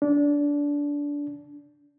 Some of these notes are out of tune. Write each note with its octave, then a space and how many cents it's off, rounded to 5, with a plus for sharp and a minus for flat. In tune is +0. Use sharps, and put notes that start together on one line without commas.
D4 -20